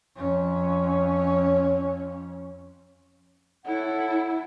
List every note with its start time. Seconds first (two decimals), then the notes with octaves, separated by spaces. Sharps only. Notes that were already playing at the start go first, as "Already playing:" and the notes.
0.16 F2 C#4
3.66 E4 A4 C#5 F#5